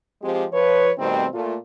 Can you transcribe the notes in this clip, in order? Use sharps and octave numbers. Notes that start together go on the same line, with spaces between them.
F3 G#3 C4 G4
F3 B4 C#5
B2 D#3 G3 A3 C4
A#2 A3 F4